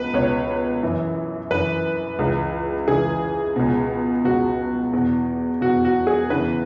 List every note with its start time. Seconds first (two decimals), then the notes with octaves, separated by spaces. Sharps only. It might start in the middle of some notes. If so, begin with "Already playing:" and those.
Already playing: C#2 B2 B4
0.14 C#2 B2 C#5
0.83 F#2 E3
1.50 F#2 E3 B4
2.19 C#2 C#3 E3
2.88 C#2 C#3 E3 G#4
3.56 C#2 B2
4.24 C#2 B2 F#4
4.93 E2 B2
5.61 E2 B2 F#4
5.85 F#4
6.07 G#4
6.30 E2 C#3 E3 B4